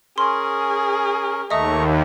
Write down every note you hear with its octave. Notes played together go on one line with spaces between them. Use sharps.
C#4 G#4 A#4 C6
D#2 A3 D#5 E5 A#5 C#6 D#6